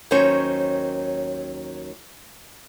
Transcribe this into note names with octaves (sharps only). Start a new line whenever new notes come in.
D#2 D#3 F#3 C#4 C5 C#5